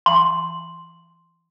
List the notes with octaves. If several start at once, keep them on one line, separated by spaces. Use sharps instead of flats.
C6